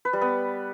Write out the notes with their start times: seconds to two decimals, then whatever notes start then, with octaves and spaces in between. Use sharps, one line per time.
0.05 B4
0.13 G3
0.21 B3